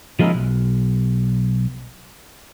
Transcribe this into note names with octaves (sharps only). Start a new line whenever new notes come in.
F3 G#3 A#3 C#4 D#4 E4
B1